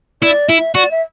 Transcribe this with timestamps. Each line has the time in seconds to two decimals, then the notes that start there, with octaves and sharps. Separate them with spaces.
0.22 E4 D5
0.48 E4 E5
0.75 F#4 D5
0.91 E5